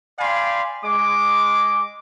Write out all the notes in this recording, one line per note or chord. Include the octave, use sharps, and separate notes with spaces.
D5 F5 G5 G#5 B5 C6
G#3 D6